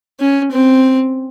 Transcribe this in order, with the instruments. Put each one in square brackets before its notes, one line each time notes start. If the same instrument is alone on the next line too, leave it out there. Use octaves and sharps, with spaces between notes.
[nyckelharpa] C#4
C4